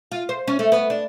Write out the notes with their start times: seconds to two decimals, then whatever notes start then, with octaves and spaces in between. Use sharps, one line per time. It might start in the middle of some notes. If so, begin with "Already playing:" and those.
0.12 F4
0.29 C5
0.47 C#4
0.59 A3
0.72 B3
0.90 D4